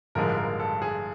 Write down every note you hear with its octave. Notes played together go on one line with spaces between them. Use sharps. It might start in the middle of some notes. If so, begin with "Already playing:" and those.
A1 G2 D3 F3 G#3 A#4
A#4
A4
G#4